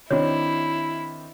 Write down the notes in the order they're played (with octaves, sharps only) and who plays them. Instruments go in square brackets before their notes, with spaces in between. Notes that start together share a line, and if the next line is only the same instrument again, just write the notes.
[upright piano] D#3 C4 D4 [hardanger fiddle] E4 [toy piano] F#4 C#5